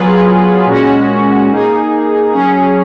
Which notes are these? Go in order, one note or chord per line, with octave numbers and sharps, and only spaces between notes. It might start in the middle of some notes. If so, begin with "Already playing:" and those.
Already playing: F#3 B3 F4 G#4 B4
A#2 G#3 C#4 F#4
A#3 D#4 G#4
F#3 C#4 G#4